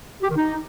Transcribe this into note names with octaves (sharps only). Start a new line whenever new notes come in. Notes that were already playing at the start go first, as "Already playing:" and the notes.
G4
D#3
D#4